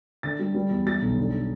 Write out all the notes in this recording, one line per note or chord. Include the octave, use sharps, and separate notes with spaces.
D3 A6
G3
G3
E2
G3 A6
B1
D3